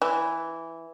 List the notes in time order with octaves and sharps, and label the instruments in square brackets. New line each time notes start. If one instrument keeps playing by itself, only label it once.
[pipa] E3